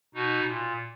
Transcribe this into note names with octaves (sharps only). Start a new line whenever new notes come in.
B2 D#4 F#4
A#2